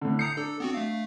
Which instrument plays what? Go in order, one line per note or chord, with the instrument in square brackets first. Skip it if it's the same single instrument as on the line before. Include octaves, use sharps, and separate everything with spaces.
[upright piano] A2 D3
[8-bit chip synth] A#5 D#6 G6 [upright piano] C7 C#7
[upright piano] D4 [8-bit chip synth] A4
[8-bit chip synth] B3 C4 F#4
A3 F5